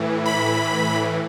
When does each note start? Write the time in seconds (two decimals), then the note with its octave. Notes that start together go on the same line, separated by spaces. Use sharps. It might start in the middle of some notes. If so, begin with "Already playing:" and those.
Already playing: A2 E3
0.26 B5